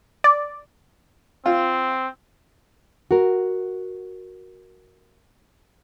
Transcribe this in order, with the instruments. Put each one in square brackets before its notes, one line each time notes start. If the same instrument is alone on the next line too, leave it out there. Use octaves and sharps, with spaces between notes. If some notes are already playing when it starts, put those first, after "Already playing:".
[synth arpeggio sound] D5
[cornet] C4 [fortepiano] F4
[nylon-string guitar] F#4 A#4